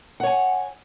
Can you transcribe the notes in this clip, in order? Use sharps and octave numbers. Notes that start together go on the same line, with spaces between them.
C#5 F#5 G#5